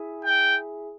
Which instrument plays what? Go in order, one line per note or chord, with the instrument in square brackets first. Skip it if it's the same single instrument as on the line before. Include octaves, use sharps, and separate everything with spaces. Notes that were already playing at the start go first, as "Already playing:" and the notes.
Already playing: [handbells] E4 G#4 E5 G#5
[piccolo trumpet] G5